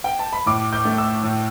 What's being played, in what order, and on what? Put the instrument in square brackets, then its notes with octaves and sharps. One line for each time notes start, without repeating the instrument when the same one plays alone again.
[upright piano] G5
A5
B5
A2 D6
G6
A3
E6
A2